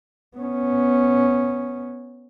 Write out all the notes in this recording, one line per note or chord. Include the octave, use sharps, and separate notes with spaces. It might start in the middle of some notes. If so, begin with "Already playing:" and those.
B3 C#4